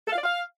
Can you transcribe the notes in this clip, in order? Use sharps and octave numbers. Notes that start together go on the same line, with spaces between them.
A4
F5
D5
F5